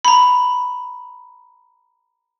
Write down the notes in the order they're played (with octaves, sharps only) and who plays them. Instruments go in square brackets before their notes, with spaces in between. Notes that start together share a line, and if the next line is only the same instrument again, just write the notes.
[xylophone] A#5 B5